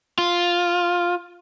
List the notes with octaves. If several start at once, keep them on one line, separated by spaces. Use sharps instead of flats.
F4